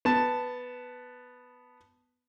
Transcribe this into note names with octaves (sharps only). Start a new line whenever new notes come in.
B3 A5